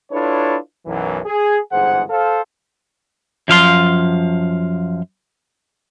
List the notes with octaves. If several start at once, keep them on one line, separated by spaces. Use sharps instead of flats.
D4 E4 F4 A4 B4 C#5
B1 F#2 E3
G#4
G1 G#2 E3 G#4 C5 F#5
A4 C5 F5
F#2 F3 F5 C6